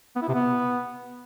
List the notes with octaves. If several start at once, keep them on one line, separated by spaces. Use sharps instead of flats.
B3
E4
C3
B3